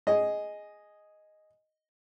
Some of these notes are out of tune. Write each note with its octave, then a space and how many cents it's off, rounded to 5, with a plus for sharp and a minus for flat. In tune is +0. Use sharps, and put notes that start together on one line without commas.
G#4 +0 D#5 +0